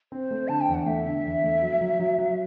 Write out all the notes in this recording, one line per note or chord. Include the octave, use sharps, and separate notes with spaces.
C4 C5
A3
D3 A5
G5
E2
F#5
A3 E5
D3
E2
A3
F#3
F#3
F#3
F#3